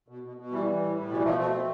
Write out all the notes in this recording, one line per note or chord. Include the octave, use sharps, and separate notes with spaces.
B2
B2
B2
E3 G3
E3
A2
A2
B2 E3 G3
B2 F3 A3
B2 A3 C4
B2